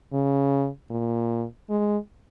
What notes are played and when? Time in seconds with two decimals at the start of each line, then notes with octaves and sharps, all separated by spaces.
0.13 C#3
0.91 A#2
1.70 G#3